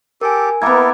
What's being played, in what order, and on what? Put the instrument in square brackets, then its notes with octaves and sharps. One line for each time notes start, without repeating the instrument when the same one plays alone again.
[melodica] G4 A4 [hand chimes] A#4 G#5
[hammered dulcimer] A#3 B3 [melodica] E4 A4 A#4 [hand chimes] D6 G#6